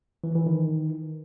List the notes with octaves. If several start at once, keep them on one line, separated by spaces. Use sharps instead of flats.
E3
E3
D#3